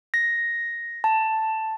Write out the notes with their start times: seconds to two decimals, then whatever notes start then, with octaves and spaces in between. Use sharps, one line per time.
0.14 A#6
1.04 A5